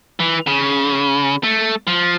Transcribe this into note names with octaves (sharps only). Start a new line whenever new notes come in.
E3
C#3
A3
F3